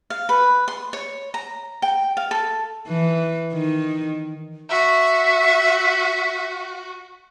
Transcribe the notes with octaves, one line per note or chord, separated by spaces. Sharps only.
F5
B4
C6
C#5
A#5
G5
F5
A4
E3
D#3
F#4 E5